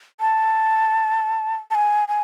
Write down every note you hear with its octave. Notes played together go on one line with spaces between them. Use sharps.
A5
A5
G#5
G#5